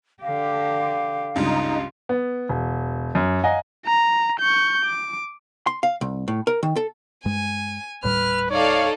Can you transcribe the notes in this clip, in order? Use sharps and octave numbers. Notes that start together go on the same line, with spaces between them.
D3 G4 F5
C#2 G2 D#4 F4
B3
E1
F#2
D#5 F5 F#5 G#5 A#5
A#5
C#6 G6
D6
C6
F5
C2
A2
A#4
D#3
A4
G2 G#3 G#5
D#1 A2 G3 B4 F6
D#4 A4 C#5 D5 F5